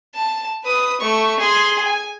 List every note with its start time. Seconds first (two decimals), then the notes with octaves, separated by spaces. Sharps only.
0.15 A5
0.64 B4 D#6
1.00 A3 C#6
1.40 G#4 C6
1.85 G#5